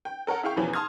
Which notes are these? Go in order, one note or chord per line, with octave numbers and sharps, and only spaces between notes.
G5
A4 A#4 C#5 F#5
E4 G#4 F5 G5 C#6
E2 B2 E3 F3 C#4
A5 C6 D#6 F6 G#6